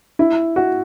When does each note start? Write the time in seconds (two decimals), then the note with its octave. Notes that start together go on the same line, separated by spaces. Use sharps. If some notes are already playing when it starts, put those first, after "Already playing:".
0.19 E4
0.56 F#4